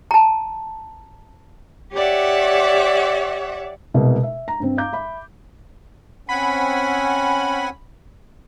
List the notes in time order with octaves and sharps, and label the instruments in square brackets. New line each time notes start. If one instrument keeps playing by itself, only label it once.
[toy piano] A5 A#5
[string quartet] G4 C#5 D5 E5 F#5
[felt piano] C2 B2 G#3
E5
A#5
G2 C4
F5 A#5 D6 G6
E5 B5
[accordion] C4 F#5 G#5 [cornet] C#4 [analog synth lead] B5